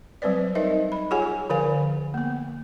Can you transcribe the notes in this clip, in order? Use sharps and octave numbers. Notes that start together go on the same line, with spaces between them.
F#3 G3 C4 B4 C5 D5
D#4 A#4 C5 D#5 E5
B5
F4 G4 G#4 C#5 F#5 G#5
D3 F3 A#4 C5 F5 G#5
A#3 B3